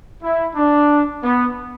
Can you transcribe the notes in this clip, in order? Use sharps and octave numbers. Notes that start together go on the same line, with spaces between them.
E4
D4
B3